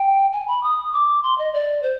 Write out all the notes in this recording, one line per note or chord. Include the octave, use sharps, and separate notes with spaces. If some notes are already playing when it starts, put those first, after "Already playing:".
Already playing: G5
G#5
B5
D#6
D6
C6
D#5
D5
C5